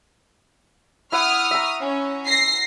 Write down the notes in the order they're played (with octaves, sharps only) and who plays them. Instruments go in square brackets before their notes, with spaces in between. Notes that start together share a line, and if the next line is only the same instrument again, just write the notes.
[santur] E4 F#5 [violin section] C#6 D#6 F6
[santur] E5 A#5
[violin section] C#4
A#6 C7